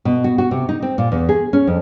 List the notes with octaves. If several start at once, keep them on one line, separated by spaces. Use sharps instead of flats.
B2
F#4
F#4
C3
D#4
C4
A#2
E2
G#4
C#4
F2